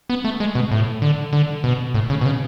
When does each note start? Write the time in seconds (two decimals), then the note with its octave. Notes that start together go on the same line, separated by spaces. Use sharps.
0.10 B3
0.25 A3
0.40 G#3
0.55 B2
0.71 A2
1.02 D3
1.33 D3
1.64 B2
1.95 A2
2.10 C#3
2.21 B2
2.26 C#3